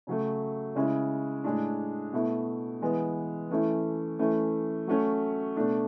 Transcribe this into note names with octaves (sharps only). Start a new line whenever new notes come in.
C#3 F#3 A3
C#3 G#3 C#4 E4
A2 G#3 D4
B2 A3 E4
E3 G#3 B3
E3 A3 C#4 E4
E3 A3 C#4 E4
F#3 A3 C#4
B2 A3 D4